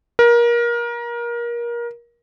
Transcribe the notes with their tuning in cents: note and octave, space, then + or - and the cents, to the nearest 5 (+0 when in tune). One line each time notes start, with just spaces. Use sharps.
A#4 +25